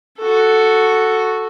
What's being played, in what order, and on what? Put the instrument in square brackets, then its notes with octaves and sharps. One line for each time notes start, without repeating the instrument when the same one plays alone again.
[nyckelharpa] F#4 A4